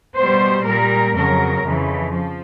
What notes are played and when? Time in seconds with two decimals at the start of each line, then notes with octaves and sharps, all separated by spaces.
0.16 B2 G3 C5
0.65 A#2 G3 A#4
1.14 F2 C#3 F#3 A#4
1.64 F2 C#3 E3
2.13 F3